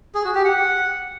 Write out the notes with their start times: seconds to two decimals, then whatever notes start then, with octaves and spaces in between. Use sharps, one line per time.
0.15 G#4
0.25 F#4
0.35 G4
0.45 F#5